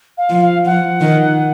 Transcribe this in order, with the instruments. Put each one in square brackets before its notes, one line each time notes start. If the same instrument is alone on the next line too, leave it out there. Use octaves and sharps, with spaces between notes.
[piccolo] F5
[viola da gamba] F3
[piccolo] F5
[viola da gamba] F3 [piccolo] F#5
[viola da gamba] D#3